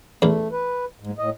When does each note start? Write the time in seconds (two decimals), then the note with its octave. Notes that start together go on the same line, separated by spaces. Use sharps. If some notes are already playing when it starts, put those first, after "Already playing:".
0.22 A1 E2 A3
0.52 B4
1.00 G#2
1.18 A2 D#5